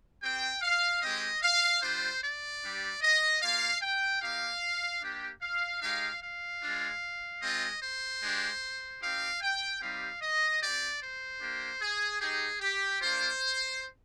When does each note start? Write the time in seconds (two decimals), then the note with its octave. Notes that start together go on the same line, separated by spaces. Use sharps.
0.22 C4 G4 G5
0.62 F5
1.02 G#3 C4 G4 D#5
1.42 F5
1.82 G3 D4 F4 C5
2.22 D5
2.62 G3 D4 G4
3.02 D#5
3.41 A#3 F4 F5
3.82 G5
4.21 A#3 D#4 G4 F5
5.02 A#3 D4 G4
5.42 F5
5.81 G#3 D#4 G4 F5
6.21 F5
6.61 G#3 D4 F4
7.42 G#3 C4 F4 D#5
7.81 C5
8.21 G#3 D4 G4
9.01 C4 D#4 G4 F5
9.41 G5
9.81 G3 C4 D#4 G4 F5
10.21 D#5
10.61 C4 G4 D5
11.01 C5
11.41 A#3 D4 G4
11.81 G#4
12.21 G#3 D#4 G4 G#4
12.61 G4
13.01 A#3 D4 F4 C5